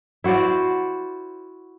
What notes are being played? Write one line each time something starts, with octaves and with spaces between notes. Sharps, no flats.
E4 F#4 C5 D5